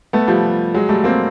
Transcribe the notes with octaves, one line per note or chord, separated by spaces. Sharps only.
A3 B3
F3 G3
F#3 G#3
G3 A3
A#3 C4